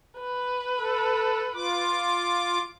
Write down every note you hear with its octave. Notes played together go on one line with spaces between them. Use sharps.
B4
A4
F4 D6